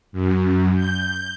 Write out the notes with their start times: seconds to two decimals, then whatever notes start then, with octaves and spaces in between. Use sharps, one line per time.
0.12 F#2
0.76 G6